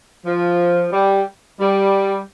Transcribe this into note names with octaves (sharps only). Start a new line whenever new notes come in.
F3
G3
G3